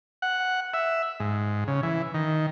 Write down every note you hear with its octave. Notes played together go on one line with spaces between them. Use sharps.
F#5
E5
G#2
C#3
E3
D#3